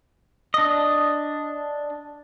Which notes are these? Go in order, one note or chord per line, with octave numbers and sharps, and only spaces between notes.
D4 D#5